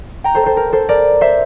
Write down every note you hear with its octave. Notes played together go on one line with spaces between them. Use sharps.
G5 A#5
A4 C5
A4 C5
A#4
A4 C5
A#4 D5
C5 E5